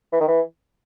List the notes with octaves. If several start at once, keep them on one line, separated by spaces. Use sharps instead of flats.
E3
D#3
E3